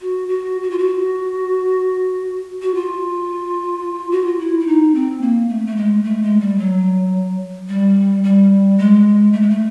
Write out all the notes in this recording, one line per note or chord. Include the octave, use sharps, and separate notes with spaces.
F#4
F#4
F#4
F4
F#4
F#4
F4
F#4
F4
E4
E4
D#4
C4
A#3
A3
A3
G#3
A3
G#3
G3
F#3
G3
G3
G#3
A3
G#3
A3